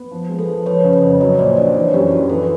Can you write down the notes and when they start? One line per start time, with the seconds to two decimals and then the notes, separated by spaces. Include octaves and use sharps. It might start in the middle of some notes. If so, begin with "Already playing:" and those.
Already playing: B3
0.11 F3
0.29 G#3
0.39 A4 B4
0.48 F3
0.66 F3 B4 C#5
0.84 C#3
0.93 B4 C#5
1.02 F2
1.20 F#3 C#5 D#5
1.39 A#2 C5 D5
1.57 D4 C5 D5
1.75 E3 B4 C#5
1.94 F#2 G4
2.12 E3 F#4
2.29 E3 A4 B4